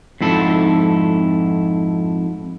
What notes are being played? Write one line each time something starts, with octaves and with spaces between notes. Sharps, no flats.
F2 G#2 E4 A4